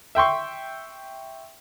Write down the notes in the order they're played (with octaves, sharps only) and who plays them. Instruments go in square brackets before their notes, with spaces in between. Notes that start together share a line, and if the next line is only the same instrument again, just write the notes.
[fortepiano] E5 G5 C6 C#6